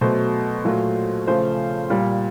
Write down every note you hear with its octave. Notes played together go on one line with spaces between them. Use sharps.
B2 F#3 A3 C5
A#2 F#3 A3
C#3 F3 A3 C5
A#2 G3